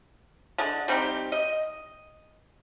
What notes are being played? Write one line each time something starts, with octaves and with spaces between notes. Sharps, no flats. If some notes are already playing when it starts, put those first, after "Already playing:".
D3 G#3
G3 C4 D#4 G4
D#5